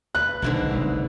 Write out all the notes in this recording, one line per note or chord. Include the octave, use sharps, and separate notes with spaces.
B4 F#6
B1 G#2 B2 D3 D#3 E4
F#1 C2